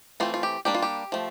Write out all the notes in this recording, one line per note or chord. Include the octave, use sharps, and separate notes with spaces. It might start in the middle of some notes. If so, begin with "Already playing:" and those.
E3 A3 C4 F4
F4
G4
G3 A#3 D4 G4
F4
G4
F3 A3